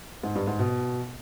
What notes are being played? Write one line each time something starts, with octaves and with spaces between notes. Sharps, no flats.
G#2
G2
G#2
B2